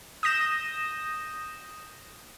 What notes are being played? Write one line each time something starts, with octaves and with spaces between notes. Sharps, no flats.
D#6 G6 A#6 E7